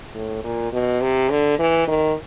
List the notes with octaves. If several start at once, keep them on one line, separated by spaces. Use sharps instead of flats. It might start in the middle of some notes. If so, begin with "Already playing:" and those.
A2
A#2
B2
C3
D3
E3
D#3